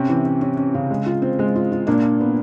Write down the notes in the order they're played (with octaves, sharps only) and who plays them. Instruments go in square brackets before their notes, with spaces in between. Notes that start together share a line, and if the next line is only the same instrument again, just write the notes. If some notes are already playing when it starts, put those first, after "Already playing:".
Already playing: [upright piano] C3 C4 [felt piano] C#4
[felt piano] E3
C#4
C#4
C#4
C#3
G#3
F4
C4
G#3
F4
F4
[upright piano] A#2 A#3 [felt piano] D4
[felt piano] D4
B3